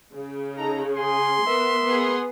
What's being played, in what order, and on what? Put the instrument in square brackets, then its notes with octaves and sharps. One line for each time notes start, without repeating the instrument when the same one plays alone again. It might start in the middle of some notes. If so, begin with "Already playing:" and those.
[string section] C#3
[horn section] D#4 A4 A#5
[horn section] G#4 [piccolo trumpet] C6
[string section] B3 [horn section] A#4 E5
[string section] B3 G#4